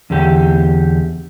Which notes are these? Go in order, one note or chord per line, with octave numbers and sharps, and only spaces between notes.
E2 D3 G4